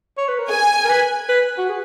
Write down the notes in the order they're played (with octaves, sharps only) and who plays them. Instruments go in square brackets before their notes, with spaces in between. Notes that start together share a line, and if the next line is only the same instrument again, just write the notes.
[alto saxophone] C#5
B4
A#4
[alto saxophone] G#4 [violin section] G#5
[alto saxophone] A#4
B4
B4
F#4
G#4